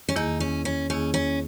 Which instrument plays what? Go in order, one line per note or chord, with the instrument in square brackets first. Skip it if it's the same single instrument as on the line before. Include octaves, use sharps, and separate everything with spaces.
[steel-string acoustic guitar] C#4
[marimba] E2 D#3 A#3 E4 G#4 [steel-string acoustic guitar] D#4
[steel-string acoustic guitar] C#4
C#4
[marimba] E2 D#3 A#3 E4 G#4 [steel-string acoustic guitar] C#4
[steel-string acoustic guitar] C#4